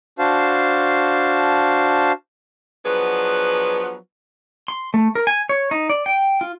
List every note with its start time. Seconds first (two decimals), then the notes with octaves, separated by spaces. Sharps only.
0.19 D4 F#4 C5 F5 A5
2.86 F3 F#3 B3 D4 G#4 B4
4.68 C6
4.94 A3
5.15 A#4
5.27 G#5
5.49 C#5
5.71 D#4
5.90 D5
6.06 G5
6.41 F4